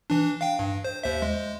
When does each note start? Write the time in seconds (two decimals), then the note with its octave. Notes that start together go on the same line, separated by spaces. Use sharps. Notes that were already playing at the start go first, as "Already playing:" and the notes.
0.10 E3 D4
0.41 F5 G5
0.59 G2
0.84 C5
1.03 D#2 C5 E5
1.22 G#3